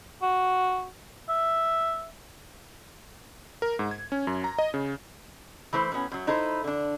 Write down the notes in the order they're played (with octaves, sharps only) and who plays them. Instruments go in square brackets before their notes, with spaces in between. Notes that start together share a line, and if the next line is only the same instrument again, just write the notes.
[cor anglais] F#4
E5
[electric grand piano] A#4
G#2
G#6
C#4
F#2
A#5
D#5
C#3
[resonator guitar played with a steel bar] E3 A3 E4 C5
A2 F#3 B3 C#4
F#2 F#3
D#4 E4 A4 C5
D3 D4